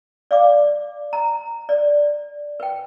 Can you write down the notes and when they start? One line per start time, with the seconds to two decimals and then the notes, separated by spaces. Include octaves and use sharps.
0.31 D5 F5 D6
1.13 A#5
1.69 D5
2.60 B4 G5